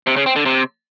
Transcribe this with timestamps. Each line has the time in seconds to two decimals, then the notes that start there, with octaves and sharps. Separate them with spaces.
0.07 C3
0.16 C#3
0.26 C4
0.36 D3
0.46 C3